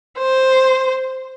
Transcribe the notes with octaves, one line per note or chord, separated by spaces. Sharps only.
C5